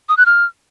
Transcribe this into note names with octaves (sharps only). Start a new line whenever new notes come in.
D#6
F#6
F6